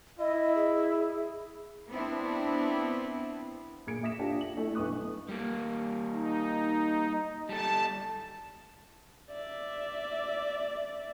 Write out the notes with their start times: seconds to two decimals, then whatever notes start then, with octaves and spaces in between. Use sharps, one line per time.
0.19 E4 D#5
0.55 G#4
1.89 B3 C4 D4 E4
3.87 A#2 G#4 G#6 C#7 D7
4.03 E5 D#6 A#6 B6 E7
4.19 D4 F4 G4
4.41 F#7
4.57 A3 E4
4.75 B1 G2 B4 C#6 D#6 F#6
5.29 G3 A#3
6.11 D#4
7.49 G3 A4 A5
9.32 D5 E5